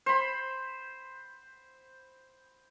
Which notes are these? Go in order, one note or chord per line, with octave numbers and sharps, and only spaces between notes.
C5 B5